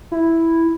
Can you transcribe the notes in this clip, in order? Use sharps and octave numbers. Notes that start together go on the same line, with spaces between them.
E4